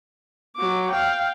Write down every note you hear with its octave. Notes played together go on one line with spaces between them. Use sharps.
F#3 D6
F5 G5